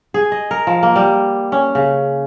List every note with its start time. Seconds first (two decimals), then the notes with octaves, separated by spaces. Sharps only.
0.14 G#4
0.32 D#5
0.51 A#4
0.67 F3
0.83 A#3
0.96 G3
1.52 C#4
1.75 C#3